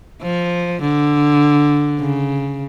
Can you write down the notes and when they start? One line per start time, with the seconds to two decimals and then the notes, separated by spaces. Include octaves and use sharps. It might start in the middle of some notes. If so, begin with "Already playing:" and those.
0.22 F3
0.82 D3
2.00 C#3